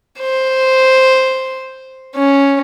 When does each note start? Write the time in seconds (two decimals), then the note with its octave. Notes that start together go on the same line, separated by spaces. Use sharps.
0.19 C5
2.15 C#4